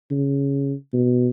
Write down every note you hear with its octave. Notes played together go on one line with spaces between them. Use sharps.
C#3
B2